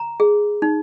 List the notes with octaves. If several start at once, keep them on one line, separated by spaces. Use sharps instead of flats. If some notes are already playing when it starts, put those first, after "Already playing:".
Already playing: A#5
G#4
D#4